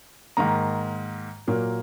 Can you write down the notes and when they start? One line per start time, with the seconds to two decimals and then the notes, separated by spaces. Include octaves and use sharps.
0.37 G#2 D#3 A#3 A#5
1.47 A#2 F#3 A#3